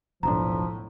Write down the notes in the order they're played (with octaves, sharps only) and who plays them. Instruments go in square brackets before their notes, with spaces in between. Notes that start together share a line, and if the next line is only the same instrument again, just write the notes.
[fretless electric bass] E1 B1 D4 [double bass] A2 [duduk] F3 [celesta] A#5